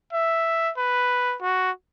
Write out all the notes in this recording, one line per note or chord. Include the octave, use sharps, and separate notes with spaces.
E5
B4
F#4